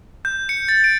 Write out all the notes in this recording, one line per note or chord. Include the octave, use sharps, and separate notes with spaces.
G6
C#7
A6
D7